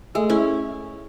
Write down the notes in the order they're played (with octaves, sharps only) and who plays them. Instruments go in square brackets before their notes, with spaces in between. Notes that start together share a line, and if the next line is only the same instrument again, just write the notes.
[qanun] G#3 [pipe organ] A3 A4
[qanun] C#4 E4